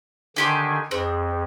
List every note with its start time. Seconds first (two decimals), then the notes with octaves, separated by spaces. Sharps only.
0.36 D3 D#3 D4 G4 G#5 C6
0.91 F2 C4 G#4